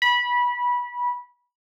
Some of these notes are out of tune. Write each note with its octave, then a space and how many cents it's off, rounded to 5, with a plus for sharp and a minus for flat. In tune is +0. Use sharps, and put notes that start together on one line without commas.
B5 -20